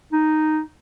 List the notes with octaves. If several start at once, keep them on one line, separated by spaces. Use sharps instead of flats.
D#4